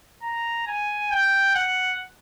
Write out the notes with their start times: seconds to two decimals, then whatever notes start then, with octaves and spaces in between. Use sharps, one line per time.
0.23 A#5
0.67 G#5
1.11 G5
1.55 F#5